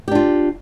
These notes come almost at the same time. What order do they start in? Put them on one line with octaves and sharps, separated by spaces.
G4 D4 F4